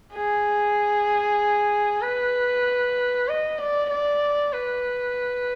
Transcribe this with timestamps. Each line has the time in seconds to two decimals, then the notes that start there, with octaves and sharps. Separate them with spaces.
0.14 G#4
2.02 B4
3.28 D#5
3.59 D5
3.90 D5
4.53 B4